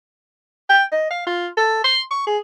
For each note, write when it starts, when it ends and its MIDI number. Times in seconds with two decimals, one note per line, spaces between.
0.69 0.83 79
0.92 1.07 75
1.11 1.23 77
1.27 1.47 65
1.57 1.83 69
1.84 2.01 84
2.11 2.23 85
2.27 2.38 68